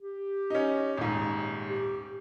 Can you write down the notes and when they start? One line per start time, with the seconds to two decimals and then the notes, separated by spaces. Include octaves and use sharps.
0.01 G4
0.50 C#4 D#4
0.97 D#1 G#2
1.69 G4